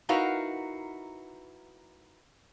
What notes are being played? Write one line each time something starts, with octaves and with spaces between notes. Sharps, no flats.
D#4 E4 F#4 A#4 B4 F5